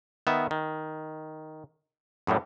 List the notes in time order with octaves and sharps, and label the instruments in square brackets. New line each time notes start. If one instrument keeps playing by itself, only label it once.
[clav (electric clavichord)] D#3 B3 E5
D#3
F#2 A2 F#3 G3